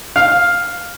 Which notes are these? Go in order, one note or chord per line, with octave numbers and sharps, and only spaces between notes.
F5